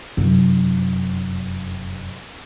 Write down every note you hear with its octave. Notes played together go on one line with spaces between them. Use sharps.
F1 F#2